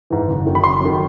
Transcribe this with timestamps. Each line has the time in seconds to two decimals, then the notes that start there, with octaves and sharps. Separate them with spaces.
0.10 G#2 E3
0.28 F#1
0.46 F#2 D#3
0.55 B5
0.63 F#1 C6
0.80 F#2 D#3